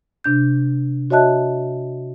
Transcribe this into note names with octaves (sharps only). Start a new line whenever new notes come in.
C3 D4 G6
F#4 C#5 D#5 E5 A5 F#6